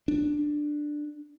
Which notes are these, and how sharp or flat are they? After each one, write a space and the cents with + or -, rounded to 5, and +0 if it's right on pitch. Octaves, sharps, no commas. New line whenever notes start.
D4 +10